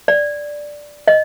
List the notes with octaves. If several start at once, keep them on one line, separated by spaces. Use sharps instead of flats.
D5
D#5